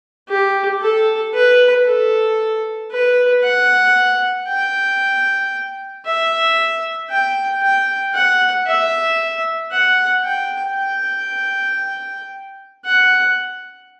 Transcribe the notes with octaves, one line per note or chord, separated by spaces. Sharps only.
G4
A4
B4
A4
B4
F#5
G5
E5
G5
G5
F#5
E5
F#5
G5
G5
F#5